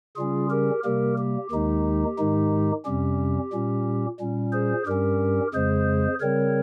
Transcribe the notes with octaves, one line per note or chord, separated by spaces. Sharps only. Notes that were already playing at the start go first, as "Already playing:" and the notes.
C#3 G3 C#4 F4 G#4
G4 A#4
C3 G3 A#3 G4 A#4
G4
D#2 D#3 G#3 D#4 G4
G#2 D#3 G#3 D#4
F2 C3 G3 C#4 G4
A#2 G3 C#4
A#2 G3 C#4
G#4 C5
G2 G3 C#4 G4 A#4
F2 C#3 G#3 G#4 C5
C#3 G3 C4 A#4 C#5